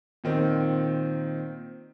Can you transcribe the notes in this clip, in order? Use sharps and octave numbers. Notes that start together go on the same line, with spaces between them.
A#2 D#3 C4